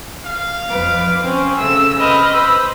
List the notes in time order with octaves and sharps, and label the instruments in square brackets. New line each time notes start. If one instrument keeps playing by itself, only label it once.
[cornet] F5
[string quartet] F2 B4 D6
[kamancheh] C4 C#4 [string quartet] C5
[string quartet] C#3 A3 [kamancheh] E6
[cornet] C4 [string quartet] B4 [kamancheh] D#5 F6 [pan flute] B5
[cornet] C5 [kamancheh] B5 [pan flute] E6